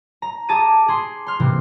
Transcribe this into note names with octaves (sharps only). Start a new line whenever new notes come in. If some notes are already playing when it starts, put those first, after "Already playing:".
A#5
G#4 A5 D6 A#6 D#7
G#4 C6
C6 F6
C3 E3 A#3